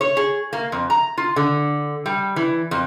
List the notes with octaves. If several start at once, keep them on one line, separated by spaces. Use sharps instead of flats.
C#5
G#4
A#3
F2
A#5
F4
D3
G3
E3
F2